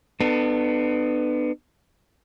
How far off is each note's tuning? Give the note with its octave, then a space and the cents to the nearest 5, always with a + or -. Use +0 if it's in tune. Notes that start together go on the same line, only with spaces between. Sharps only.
B3 +15 D4 +45 A4 +20